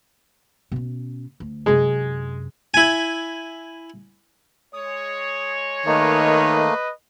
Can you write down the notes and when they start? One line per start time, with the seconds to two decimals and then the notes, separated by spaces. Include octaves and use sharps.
0.72 B2 C#4
1.40 D2
1.66 F#2 C3 G#3
2.74 E4 G#5
4.73 G#3 C#5 D#6
5.86 D#3 A3 A#3 B4 D#5